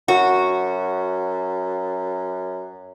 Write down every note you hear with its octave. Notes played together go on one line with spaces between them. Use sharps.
F#2 F#4